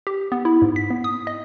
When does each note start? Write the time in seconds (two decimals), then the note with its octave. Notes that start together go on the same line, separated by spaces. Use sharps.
0.07 G4
0.32 B3
0.45 E4
0.62 G#2
0.76 B6
0.90 B3
1.04 D#6
1.27 D#5